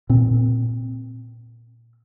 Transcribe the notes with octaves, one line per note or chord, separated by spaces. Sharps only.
A#2 C4